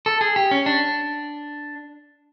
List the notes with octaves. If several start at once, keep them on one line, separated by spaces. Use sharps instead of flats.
A4
G#4
G4
C#4
D4